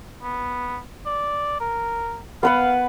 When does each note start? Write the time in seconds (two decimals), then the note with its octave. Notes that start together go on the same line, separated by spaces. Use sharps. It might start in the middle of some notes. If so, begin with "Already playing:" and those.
0.23 B3
1.06 D5
1.61 A#4
2.43 B3 B4 F5 F#5